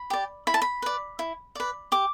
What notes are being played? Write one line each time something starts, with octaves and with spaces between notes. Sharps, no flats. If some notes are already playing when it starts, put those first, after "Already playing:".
Already playing: B5
G4 D5
E4 B5
A5
B5
B4 D5
E4
B4 D5
G4 D6